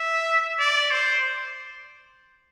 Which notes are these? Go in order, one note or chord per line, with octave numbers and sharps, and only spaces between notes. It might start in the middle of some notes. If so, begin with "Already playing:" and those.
Already playing: E5
D5
C5